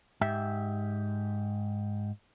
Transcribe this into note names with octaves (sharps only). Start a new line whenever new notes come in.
G#2 G4 E5